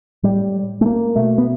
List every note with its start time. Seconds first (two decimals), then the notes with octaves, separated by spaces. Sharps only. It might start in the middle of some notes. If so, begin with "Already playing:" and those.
0.23 A2 G3
0.81 A3
0.86 A#3
1.16 B2 A3
1.38 B3